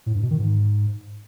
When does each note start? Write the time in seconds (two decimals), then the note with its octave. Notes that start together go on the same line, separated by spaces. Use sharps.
0.06 A2
0.14 G2
0.22 B2
0.31 D#3
0.39 G#2